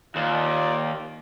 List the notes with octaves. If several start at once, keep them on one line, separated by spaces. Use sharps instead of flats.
D#2 D#4 F4 D5